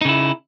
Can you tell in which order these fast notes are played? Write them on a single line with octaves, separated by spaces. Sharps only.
D#4 C#3 E4